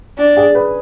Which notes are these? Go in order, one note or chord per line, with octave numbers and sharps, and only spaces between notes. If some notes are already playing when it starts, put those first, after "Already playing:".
D4
G#4
B4